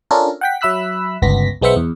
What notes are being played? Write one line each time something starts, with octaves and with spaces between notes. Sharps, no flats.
C#4 D4 F4 A4 A#4
F#5 G5 B6
F#3 E5 B5 E6 F#6 B6
G1 C#2 B3 A#6 B6
B1 G#3 B3 C5 E5 C#7
E2